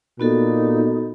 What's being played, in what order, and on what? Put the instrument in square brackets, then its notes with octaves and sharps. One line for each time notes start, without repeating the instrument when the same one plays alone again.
[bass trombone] A#2 [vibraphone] B3 F#4 A4 [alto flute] D#4